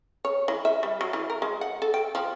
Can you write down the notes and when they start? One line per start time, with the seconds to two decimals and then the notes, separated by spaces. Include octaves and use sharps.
0.25 C#5
0.48 E3
0.65 E5
0.83 G3
1.01 F#3
1.13 E3
1.30 A#4
1.42 G#3
1.61 F#5
1.82 A4
1.94 G5
2.15 F3